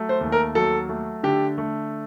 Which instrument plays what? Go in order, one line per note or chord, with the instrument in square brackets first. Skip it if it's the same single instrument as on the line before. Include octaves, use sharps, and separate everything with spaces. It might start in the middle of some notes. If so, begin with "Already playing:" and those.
Already playing: [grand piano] F#3 A3
C5
D#2
A#4
F#3 A4
A3
D3 G4
A3